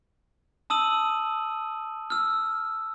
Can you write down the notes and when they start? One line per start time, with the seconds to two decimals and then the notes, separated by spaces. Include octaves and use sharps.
0.70 A5 D#6 E6 D#7 F#7
2.10 E6 F6